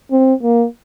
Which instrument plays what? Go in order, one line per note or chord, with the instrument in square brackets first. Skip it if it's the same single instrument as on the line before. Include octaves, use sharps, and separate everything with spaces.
[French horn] C4
A#3